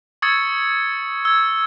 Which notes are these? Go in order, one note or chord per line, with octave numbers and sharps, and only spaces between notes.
C#6 D#6 E6 G#6 A6 C#7
E6 G#6